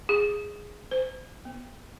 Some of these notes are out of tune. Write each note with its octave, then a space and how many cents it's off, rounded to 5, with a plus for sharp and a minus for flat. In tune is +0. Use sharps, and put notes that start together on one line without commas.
G#4 -5
C5 -35
B3 -15